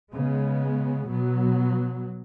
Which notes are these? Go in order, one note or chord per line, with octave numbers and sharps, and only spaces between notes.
C#3 G#3 B3
B2 F#3 B3